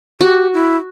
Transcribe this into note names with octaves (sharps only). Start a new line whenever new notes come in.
F#4 G4
E4